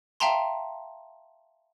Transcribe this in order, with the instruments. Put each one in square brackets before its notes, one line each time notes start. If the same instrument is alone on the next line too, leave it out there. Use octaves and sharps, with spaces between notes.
[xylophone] E5 F5 G5 A5 A#5 C6